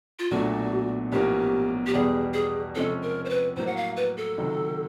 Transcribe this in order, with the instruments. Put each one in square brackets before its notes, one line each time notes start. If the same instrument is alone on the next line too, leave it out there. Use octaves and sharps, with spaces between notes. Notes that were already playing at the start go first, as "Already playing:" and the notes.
[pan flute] F4
[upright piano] B1 A#2 F#3 A3 D4 [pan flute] F#4
[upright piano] B1 A2 F3 A#3 C#4 [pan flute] G4
[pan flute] G4
[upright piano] E2 B2 G3 [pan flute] G#4
[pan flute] G#4
[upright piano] C3 F3 G#3 C#4 [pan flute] A4
[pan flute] A#4
C5
B4
[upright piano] A2 F#3 A#3 [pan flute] C5
[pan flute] F#5
F5
B4
A4
[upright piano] C#2 C3 D#3 F#3